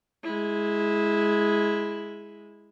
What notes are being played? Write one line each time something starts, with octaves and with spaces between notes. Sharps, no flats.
G#3 E4